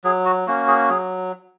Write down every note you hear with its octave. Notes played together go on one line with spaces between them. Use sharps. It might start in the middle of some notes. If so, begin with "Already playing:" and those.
F#3 G#4
F#4
A#3 C#4 F#4
G#4
F#3 G#4